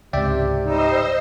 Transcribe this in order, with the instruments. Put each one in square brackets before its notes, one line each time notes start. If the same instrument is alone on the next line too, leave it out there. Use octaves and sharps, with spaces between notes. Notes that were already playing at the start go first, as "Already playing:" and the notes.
[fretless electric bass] C#2 G#2 [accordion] C3 [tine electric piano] D5 E5 G5
[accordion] G3 D#4 [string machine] C5 D#5 E6